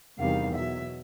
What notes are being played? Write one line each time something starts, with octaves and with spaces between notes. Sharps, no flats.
E2 C3 D#3 G3 F5
B2 F#3 E5